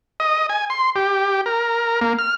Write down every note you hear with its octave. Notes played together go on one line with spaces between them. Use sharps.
D#5
G#5
C6
G4
A#4
A#3
F6